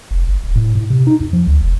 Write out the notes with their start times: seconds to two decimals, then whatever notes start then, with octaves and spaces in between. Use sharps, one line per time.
0.11 F1
0.27 G1
0.44 D#1
0.56 A2
0.75 A2
0.90 C3
1.07 D#4
1.20 F2
1.33 F3
1.47 D2
1.61 F1